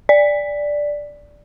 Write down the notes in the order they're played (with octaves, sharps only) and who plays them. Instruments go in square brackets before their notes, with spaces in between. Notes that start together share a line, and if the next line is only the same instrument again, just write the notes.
[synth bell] D5